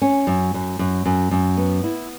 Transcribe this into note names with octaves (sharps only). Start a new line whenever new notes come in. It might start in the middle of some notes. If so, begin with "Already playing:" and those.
C#4
F#2
F#2
F#2
F#2
F#2
B3
E4